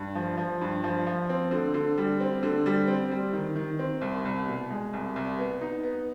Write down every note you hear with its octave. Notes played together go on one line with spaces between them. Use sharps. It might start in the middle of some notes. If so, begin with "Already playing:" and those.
Already playing: G2
F3
F3
G2
F3
F3
C4
D3
D3
G3
C4
D3
G3
C4
G3
D#3
D#3
C4
C2
C2
B2
G#3
C2
C2
B3
D#4
B3